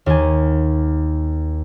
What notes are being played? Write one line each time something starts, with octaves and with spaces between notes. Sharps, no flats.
D#2 G#5